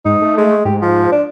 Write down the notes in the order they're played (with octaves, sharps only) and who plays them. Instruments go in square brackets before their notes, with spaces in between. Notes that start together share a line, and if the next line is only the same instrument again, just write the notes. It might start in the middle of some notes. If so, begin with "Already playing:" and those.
[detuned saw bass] G#2 [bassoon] D#4
[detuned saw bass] A3
[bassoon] G#3
[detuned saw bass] G#2 [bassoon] G4
[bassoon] F3
D4